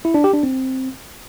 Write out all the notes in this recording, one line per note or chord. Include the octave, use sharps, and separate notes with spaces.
E4
D4
G4
D4
C4